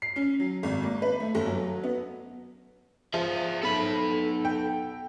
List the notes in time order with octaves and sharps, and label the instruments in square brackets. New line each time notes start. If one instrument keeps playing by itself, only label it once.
[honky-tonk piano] C7
C#4
F#3
G#1
A#3
B4
A3
G1
F#3
B3
[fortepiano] F3 [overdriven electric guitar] G#4 E5
[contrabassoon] B1 [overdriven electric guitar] A4 B5
[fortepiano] G5